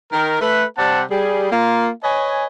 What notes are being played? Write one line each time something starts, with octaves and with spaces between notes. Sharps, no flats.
D#3 A#4
A3 B4
C3 G3 C4 D5 F#5 A5
G3 G#4
A#3 F4
B4 C#5 D#5 G#5